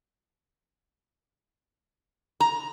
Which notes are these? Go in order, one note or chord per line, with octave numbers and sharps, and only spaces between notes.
A#5